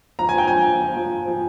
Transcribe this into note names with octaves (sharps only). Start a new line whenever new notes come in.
F3 A#5
G#5
F3 G5
F3 G#5
F3
F3
F3
F3
F3